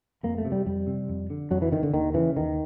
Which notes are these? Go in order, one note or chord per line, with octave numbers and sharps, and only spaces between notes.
F2 A#3
A3
C3
G3
F2 G3
C3
F2
D3
F2 F#3
E3
D3 D#3
D3
D#2 D#3
C#3 E3
D#2 D#3